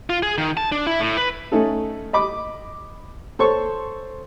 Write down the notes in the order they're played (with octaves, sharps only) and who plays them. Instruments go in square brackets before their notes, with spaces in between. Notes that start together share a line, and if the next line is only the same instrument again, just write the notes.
[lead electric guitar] F4
G#4
D#3
A5
D4
E4
A2
B4
[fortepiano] A3 C#4 D#4 A4
D#5 B5 D6
A4 C5 C#5 C#6